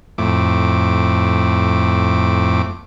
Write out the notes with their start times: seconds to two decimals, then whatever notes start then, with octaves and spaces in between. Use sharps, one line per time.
0.18 F2 A2 D6